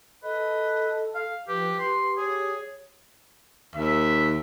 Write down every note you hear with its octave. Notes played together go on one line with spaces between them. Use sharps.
A4 B4 D#5
F5
F3 G4 B4
G4 C6
G#4 C#5
D#2 E5